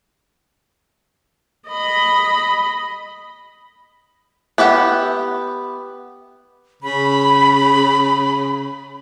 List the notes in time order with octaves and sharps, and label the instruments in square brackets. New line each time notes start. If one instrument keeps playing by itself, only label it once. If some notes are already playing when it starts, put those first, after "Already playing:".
[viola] D#5 B5
[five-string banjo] B3 G4 E5 F#5
[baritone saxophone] C#3 [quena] B5